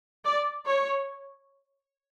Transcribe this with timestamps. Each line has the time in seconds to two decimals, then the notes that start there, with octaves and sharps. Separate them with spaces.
0.24 D5
0.63 C#5